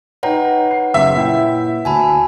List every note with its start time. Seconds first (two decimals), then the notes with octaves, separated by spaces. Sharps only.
0.23 D#4 B4 C#5 F#5 G5 A#5
0.71 C7
0.94 F#1 E5
1.14 A#2 E4 G5
1.85 D2 G#5 A5 B5